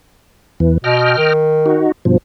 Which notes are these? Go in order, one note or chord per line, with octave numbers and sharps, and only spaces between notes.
E2 E3
B2 D#5 G5 F6
D#3
D#4 F#4
G2 B2 F3